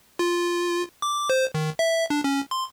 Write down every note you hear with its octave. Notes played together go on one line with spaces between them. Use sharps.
F4
D6
C5
D#3
E5
D4
C#4
C6